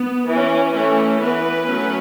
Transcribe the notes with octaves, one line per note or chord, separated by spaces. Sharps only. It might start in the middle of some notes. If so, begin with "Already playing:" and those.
Already playing: B3
E3 C#4
E3 A3 C#4
E3 B3 B4
F#3 A3 C#4